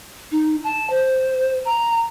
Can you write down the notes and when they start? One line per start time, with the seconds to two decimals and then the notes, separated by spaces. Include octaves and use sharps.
0.32 D#4
0.64 A5
0.90 C5
1.65 A#5